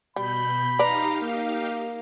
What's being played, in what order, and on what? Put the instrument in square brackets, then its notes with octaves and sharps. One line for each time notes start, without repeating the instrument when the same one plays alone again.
[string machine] B2 G6 [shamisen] G3 [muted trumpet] B5
[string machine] D#4 G4 F5 [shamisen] B4 D5 [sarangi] A#5
[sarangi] A#3